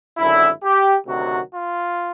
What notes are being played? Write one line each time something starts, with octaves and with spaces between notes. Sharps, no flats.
G#1 F#2 D3 E4
G4
D2 C3 D#3 F#3 F#4
F4